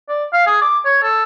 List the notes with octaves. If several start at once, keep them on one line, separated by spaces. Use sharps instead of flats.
D5
F5
G#4
D6
C#5
A4